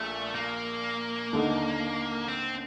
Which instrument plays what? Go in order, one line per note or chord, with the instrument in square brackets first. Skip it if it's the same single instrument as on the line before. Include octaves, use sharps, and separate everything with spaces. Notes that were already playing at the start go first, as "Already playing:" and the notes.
Already playing: [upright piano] A#1 A#2 [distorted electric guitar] A3
[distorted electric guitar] A#3
[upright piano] D#2 D3 A3 D#4
[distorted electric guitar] C4